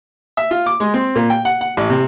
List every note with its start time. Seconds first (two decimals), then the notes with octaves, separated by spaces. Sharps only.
0.37 E5
0.51 F4
0.66 D6
0.80 G#3
0.94 C4
1.15 A#2
1.30 G5
1.45 F#5
1.61 F#5
1.77 A1
1.90 C3